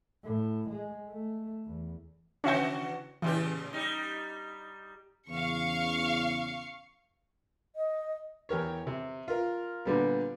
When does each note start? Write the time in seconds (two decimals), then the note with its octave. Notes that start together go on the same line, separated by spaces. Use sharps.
0.23 A2
0.69 G#3
1.07 A3
1.65 E2
2.44 C#3 E3 C#4 F#4 E5 G5
3.22 A2 C#3 E3 G4
3.73 G3 D#4
5.29 E2 C#3 F5 C#6
7.76 D#5
8.49 E2 G4 A#4 C#5
8.87 C3
9.28 F4 A#4
9.85 A#2 D3 G3 B3